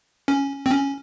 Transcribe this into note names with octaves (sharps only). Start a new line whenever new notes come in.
C#4
C4
C#4